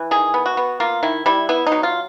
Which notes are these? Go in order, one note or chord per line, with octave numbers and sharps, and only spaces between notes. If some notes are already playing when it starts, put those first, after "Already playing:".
Already playing: E3
D#3 G#4
B3
F#4
B3
A#3 F4
D#3 E4
G3 E4
B3 E4
D#4
F#3
F4